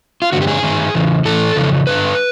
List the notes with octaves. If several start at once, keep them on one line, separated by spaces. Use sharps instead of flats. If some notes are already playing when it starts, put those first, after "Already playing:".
F4
G2 D3 F#4
G4
G#4
G2 D#3
E2 C#3 E3
A2 E3 A4
F2 C#3 E3
G2 D3 B4